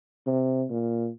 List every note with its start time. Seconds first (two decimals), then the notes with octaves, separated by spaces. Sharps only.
0.27 C3
0.70 A#2